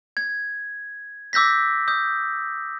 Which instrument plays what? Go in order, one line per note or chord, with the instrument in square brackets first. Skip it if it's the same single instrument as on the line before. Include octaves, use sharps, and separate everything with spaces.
[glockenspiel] G#6
D6 E6 G6 A#6 B6
D#6 G6